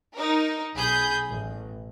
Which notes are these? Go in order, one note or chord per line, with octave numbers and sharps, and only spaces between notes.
D#4 A#4
B1 G#4 B5 G6
A1